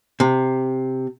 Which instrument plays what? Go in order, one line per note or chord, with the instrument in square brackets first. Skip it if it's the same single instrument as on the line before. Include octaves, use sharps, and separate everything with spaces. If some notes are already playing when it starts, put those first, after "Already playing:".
[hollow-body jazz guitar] C3